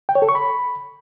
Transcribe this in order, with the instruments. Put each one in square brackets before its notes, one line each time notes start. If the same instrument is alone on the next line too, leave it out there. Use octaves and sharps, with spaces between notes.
[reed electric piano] G5
C#5
A4
C#6
B5